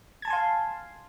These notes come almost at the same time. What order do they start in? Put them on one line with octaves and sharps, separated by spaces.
G#6 A5 G#5 C6 F5